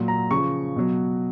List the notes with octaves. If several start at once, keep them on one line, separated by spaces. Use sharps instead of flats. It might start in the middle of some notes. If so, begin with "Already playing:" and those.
Already playing: A#2 F#3
A#5
C#3 F3 C#6
B2 F#3